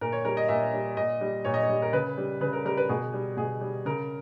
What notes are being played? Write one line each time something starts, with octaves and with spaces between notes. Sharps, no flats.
A#2 A#4
C#5
G3 A#4
D#5
A#2 E5
G3
A#2 D#5
G3
A#2 C#5
D#5
C#5
G3
A#4
C#3 B4
G3
C#3 B4
A#4
G3 A#4
B4
B2 G#4
G3
B2 G#4
G3
C#3 A#4